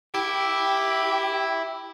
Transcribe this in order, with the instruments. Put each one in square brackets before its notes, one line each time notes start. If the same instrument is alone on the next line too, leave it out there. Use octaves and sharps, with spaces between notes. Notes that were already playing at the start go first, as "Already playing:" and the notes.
[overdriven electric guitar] E4 [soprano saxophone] G4 [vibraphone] G5